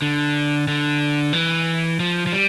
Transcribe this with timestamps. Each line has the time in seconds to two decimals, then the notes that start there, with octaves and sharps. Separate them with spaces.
0.02 D3
0.68 D3
1.33 E3
2.00 F3
2.27 F3
2.33 G3